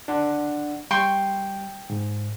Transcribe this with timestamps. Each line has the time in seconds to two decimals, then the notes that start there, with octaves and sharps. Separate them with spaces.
0.08 D4 F#5
0.91 G3 G5 C6 C#6
1.90 G#2